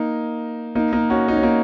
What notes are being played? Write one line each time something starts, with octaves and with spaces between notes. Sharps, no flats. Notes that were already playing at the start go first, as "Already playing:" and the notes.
Already playing: A#3 D#4
A#3 D#4
A#3 D#4
C#4 F#4
D#4
C#4
A#3 D#4